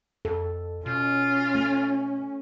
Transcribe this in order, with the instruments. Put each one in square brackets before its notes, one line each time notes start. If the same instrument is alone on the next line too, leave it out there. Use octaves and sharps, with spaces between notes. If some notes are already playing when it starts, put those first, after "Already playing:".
[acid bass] F2 [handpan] A4
[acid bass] B2 [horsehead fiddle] C#4 [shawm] F4
[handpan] A3